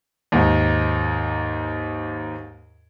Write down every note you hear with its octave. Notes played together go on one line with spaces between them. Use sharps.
D#2 G#2